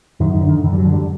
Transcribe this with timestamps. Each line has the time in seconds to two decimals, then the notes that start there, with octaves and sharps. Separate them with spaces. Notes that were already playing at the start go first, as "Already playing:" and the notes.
0.20 F#2 D#3
0.34 D#3
0.41 D3
0.49 D#3
0.64 F#2 E3
0.73 G3
0.78 F#3
0.85 D3
0.92 G3